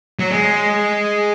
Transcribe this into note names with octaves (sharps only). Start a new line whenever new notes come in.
F#3
G#3